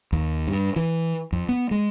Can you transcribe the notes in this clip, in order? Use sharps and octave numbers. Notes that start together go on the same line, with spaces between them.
D#2
G2
E3
F2
B3
G#3